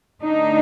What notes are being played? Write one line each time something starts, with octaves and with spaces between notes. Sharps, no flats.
D3 A3 D4 D#4